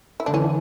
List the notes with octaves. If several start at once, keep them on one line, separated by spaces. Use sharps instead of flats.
E4
D3 D4
E3 C#4